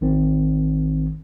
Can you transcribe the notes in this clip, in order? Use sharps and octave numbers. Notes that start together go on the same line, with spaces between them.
A1 D#3 C4